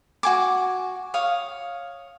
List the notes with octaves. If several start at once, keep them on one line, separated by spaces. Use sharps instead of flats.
F#4 G#5 D6
C#5 F5 D#6